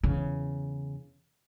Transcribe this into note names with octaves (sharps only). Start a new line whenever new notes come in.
E2 C#3